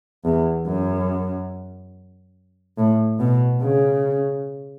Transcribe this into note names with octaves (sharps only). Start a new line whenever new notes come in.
E2
F#2
A2
B2
C#3